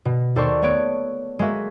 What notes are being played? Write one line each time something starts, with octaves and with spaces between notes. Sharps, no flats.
B2
D#2 A4 C5 D5 C6 C#6
A3 B3 C#5 F#6 D7
G#3 A#3 F#4 E5